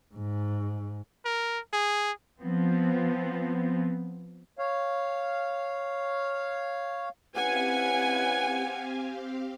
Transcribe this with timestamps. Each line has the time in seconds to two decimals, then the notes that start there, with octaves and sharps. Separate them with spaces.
0.14 G#2
1.25 A#4
1.73 G#4
2.42 F3 B3 C4
4.59 C#5 F5
7.36 C4 C#4 E4 G4 B4 F5 F#5 G#5